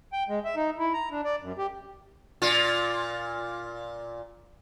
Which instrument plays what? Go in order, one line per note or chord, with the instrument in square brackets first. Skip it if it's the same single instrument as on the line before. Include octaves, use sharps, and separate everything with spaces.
[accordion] G5
G#3
E5
D#4
E4
A#5
D4
D5
F#2
G4
[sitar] A#2 F4